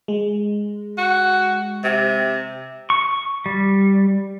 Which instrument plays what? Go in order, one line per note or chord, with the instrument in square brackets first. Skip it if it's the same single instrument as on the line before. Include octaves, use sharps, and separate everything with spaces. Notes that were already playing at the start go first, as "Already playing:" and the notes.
[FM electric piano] G#3
[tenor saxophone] F#4
C3
[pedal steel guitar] C#6
G3